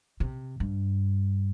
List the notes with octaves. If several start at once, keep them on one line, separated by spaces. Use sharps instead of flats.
C3
G2